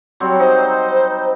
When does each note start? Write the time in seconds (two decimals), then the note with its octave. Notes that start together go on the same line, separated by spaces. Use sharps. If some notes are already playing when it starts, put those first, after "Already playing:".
0.20 F#3 G3 C4
0.40 D#4 C5